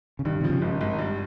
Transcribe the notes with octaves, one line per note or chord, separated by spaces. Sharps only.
C#3
G2 D#3
C3 F3
C#3
G#1
G#1
G2